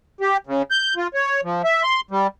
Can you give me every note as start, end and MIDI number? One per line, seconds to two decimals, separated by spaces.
0.21 0.37 67
0.47 0.62 49
0.71 0.94 91
0.96 1.08 65
1.14 1.41 73
1.44 1.62 53
1.64 1.83 76
1.83 2.01 84
2.11 2.27 55